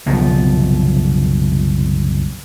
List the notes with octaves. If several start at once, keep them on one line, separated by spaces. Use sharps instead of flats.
F#1 C2 B2 F3